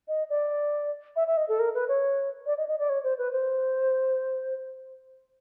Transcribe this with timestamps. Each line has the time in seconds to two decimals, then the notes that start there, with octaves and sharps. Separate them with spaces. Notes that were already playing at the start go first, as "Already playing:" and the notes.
0.08 D#5
0.30 D5
1.16 E5
1.27 E5
1.37 D#5
1.48 A4
1.59 A#4
1.74 B4
1.88 C#5
2.46 D5
2.57 D#5
2.68 D#5
2.79 D5
2.89 C#5
3.04 C5
3.18 B4
3.32 C5